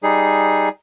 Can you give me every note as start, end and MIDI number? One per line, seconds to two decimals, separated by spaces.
0.03 0.69 55
0.03 0.69 63
0.03 0.69 68